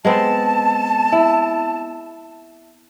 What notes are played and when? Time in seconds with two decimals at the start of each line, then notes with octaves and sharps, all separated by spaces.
0.05 G#3 B3 C4 A5
1.12 E4